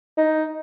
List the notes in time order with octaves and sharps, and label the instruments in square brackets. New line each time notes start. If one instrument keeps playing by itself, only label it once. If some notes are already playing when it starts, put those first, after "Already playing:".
[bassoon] D#4